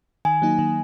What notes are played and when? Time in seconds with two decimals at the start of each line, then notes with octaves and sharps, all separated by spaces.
0.25 D#3 G#5
0.42 F#3 A#3 D#4
0.59 D#3